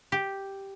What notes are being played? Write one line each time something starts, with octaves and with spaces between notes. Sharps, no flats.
G4